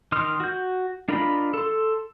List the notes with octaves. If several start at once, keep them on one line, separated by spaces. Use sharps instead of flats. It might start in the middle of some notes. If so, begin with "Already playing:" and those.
D#3 D#5 C6 F6
F#4 G6
D4 F4 A#4 D#5 B5
A4 C6